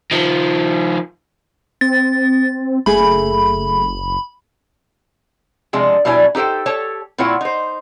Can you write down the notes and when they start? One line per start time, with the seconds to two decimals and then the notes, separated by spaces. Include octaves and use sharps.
0.11 D#3 F3
1.81 C4 A6
2.86 F#1 A3 G#4 B5
5.73 C3 F3 G#3 D4
6.05 B2 G3 D4 E4 C#5 G#5
6.35 D#4 G4 A4 C5 G5
6.66 G4 A4 C#5 A5
7.18 A#2 C4 E4 F4 C#5 F#5
7.41 D#4 C5